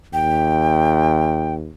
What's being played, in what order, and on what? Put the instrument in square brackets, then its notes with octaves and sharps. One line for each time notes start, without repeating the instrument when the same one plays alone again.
[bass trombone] D#2 [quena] G5